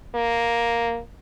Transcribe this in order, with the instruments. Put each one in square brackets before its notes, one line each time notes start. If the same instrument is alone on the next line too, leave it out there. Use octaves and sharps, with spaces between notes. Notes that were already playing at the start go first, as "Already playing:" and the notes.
[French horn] A#3